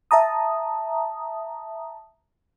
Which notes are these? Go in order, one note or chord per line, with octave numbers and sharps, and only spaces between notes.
E5 A5 A#5 D#6